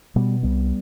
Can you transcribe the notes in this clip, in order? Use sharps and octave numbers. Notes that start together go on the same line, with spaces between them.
B2 G3 B3
C2 G3 B3